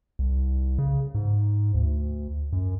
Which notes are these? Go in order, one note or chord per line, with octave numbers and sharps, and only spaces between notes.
C2
C#3
G#2
D2
F#2